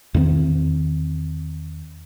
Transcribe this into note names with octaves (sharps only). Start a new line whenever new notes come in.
E2 D#3 A#3 C4